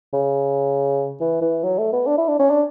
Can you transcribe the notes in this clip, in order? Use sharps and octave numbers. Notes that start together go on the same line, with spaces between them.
C#3
E3
E3
F#3
A3
B3
D4
E4
D4
C#4
D4